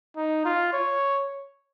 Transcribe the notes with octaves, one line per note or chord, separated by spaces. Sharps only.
D#4
F4
C#5